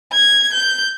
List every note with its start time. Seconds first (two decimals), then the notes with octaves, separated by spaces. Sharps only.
0.13 G#6
0.53 G6